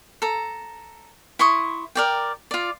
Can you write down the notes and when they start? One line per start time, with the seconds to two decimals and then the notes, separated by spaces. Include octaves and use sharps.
0.22 A4 A#5
1.39 E4 C6 C#6 D#6
1.95 A#4 D5 G5
2.51 F4 D5